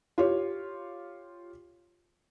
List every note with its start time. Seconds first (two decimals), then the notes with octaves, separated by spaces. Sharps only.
0.18 F4 G4 C#5